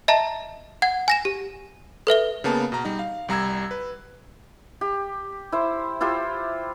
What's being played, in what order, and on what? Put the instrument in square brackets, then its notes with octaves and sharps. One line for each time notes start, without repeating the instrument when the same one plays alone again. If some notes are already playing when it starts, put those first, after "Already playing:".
[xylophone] D#5 E5 A5 A#5
F#5 G#6
G#5 A#6 E7
G4
A4 B4 E5 G7
[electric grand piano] C#3 A#3 B3 A5
B2 A#5
G3 D#4
F5
C2 G3 A#5 E6 G#6
B4
[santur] G4
E4 C5
E4 F4 G4 C5